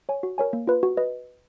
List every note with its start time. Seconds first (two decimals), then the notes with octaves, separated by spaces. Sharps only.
0.09 C#5 G#5
0.23 F#4
0.38 A#4 C#5 G#5
0.53 A#3
0.67 F4 B4
0.83 F#4
0.97 B4 D#5